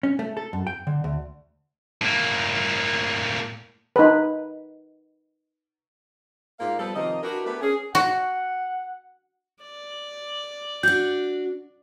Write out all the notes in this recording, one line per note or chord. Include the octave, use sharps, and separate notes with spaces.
C#4
A3
A4
F#2
G5
D3
D2
A2 A#3
D#4 B4
G#2 A#3 F4 D5 F5
F3 G3 B3 A4
C3 D#3 F3 A#3 D#5
D4 E4 F#4 G4 A#4 B4
A3 B3 D4 G4 A#4 B4
C#4 G#4
F#4 F#5
D5
D4 F#4 G6